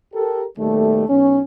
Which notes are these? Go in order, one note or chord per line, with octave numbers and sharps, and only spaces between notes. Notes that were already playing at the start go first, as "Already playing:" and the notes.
G4 A4 A#4
D#2 B2 G3 A3
B1 C#4